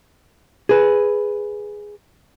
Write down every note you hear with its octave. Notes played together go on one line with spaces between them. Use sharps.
G#4 B4